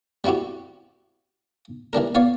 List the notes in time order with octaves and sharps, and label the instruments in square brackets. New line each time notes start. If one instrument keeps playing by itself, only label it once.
[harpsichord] G3 C4 E4 F#4 G4
E3 G3 D4 A#4
B3 C#5 D5 F5